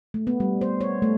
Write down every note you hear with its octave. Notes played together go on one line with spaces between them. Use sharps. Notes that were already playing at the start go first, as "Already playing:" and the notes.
A3
B3
G3
C5
C#5
A3